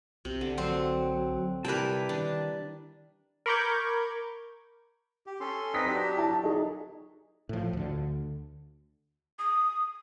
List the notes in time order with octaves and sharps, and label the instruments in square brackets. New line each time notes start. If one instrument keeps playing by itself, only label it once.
[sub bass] B1 [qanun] C3
[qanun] D3
[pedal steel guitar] F#3 [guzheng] C4
[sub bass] C3 [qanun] G3 E4 A#4 [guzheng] B4 G5 [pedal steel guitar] A5 D6
[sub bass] D#3 [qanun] D4
[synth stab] A#4 B5 C#6 D6 G6 G#6
[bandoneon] G4
C#4 A4 C6
[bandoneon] C4 D#4 B4 [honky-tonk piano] D#6 A#6 B6
[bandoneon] F#3 D4 G4
[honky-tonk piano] E4 A5
[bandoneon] F#3 [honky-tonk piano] D#4 G#4
[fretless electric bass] A2 F3
D2 D3
[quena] D#6